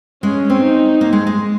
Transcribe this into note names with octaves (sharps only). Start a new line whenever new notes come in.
G#3 C#4
C4
D#4
A#3
G#3
G#3